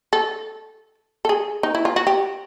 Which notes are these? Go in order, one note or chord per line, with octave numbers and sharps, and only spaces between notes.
A4
A4
G#4
D#4
E4
F4
F#4
G4